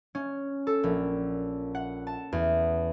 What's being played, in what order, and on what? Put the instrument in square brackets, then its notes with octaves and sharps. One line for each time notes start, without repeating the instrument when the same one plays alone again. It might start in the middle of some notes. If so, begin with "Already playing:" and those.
[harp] C#4
A4
A#1
F#5
A5
E2